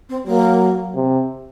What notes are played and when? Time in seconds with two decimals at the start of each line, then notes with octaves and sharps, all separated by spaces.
0.09 C4
0.27 F#3 A#3
0.95 C3